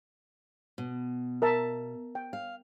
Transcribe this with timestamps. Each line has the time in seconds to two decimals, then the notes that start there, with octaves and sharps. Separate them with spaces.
0.78 B2
1.42 A#4 E5 A5
2.15 G5
2.33 F5